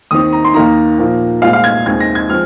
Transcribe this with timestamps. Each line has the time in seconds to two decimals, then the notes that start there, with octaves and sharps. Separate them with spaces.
0.11 D#2 D#3 C4 D#6
0.33 A#5
0.45 C6
0.54 D#2 D#3 A#3 D#4 A#5
0.99 A#2 F3 A#3
1.42 C2 A#2 G#3 C4 F5
1.53 F5
1.64 G#6
1.86 D#2 D#3 G#3 C4 G#6
2.00 A#6
2.15 G#6
2.30 F3 G#3 C4 F6